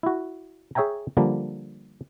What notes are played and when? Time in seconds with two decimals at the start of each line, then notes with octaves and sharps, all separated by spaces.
0.03 E4 F#4
0.75 G#4 C#5 E5 G5 G#5 A#5
1.17 D3 F3 G3 A#3